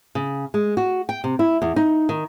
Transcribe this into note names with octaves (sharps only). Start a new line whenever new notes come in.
C#3
G#3
F#4
G5
C3
E4
E2
D#4
D#3